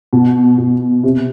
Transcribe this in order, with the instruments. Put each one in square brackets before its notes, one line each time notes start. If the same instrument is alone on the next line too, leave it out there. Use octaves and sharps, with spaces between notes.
[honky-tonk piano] B2
B2
C3